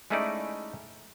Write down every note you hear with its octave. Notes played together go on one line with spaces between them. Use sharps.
G#3 A3 C#4 D#4 E4 D5